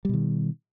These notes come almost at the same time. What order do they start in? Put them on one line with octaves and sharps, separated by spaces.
G3 B2 D#3